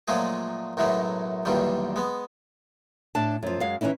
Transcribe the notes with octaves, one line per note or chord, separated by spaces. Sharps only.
A#2 F3 F#3 G#3 A3 G#4
B1 F#2 A2 F#3 G#3 A3
B1 E2 A#2 D3 D#3 G3
G#3 B3
A2 D4 A5
F#2 F3
F#2 G#3 F5
E3 F#3 C#4 D#4 E4